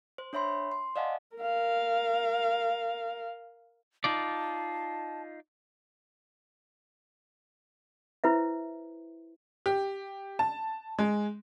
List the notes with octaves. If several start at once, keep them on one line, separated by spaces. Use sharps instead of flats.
C5
D4 C#5 E5 B5 C6
C6
D5 D#5 F5 F#5 G#5 A5
A#4 F5
D#4 F4 D5 A5
E4 B4 C5 E5
G4
A5
G#3